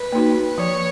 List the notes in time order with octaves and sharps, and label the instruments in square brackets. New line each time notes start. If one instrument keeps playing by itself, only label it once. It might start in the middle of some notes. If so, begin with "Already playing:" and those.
Already playing: [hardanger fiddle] B4
[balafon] A#3 D#4 F#4
[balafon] F3 [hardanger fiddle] C#5